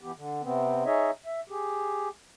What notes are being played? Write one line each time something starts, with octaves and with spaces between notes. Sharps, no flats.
E3 B3 G4
D3
C3 B3 C4
D#4 G#4 C#5 D#5 E5
E5
G4 G#4